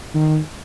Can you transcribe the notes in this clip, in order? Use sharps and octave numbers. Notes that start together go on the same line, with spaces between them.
D#3